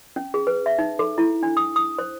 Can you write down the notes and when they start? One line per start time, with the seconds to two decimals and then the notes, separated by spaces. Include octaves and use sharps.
0.16 C#4
0.34 G#4
0.47 B4
0.66 E5
0.79 D#4
0.99 A4
1.18 E4
1.43 D4
1.57 D#6
1.76 D#6
1.98 C5